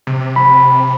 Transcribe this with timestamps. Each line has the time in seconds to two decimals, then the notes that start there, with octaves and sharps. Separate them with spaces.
0.07 C3
0.36 B5